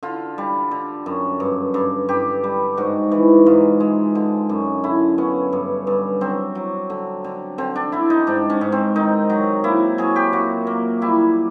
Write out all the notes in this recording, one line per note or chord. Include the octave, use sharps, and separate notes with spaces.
D3 F4
G3
D3
F#2
G2
G2
G2 G4
G3
G#2 F#4
E3
G#2 F4
G#3
D3
F#2
D3 E4
B3 C#4
G2
G2
F#3 C4
F#3
D3
D3
D3 C4
D4
D3 E4
D#4
G#2 D4
C#4
G#2
C4
D#3 D#4
F#3
A#3 E4
F#3 G#4
G4
A#2 F#4
A#3
G3 E4